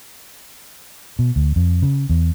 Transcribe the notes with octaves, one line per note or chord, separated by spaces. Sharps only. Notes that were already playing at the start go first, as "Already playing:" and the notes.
B2
D2
F2
C#3
E2